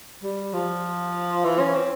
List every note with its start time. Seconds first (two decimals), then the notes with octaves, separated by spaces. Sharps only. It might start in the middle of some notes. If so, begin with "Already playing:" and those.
0.23 G3
0.53 F3
1.44 E3
1.59 C#4
1.75 C4